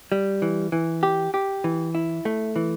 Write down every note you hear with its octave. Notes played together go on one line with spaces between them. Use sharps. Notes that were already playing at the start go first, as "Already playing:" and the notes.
G3
E3
E3
G4
G4
E3
E4
A3
E3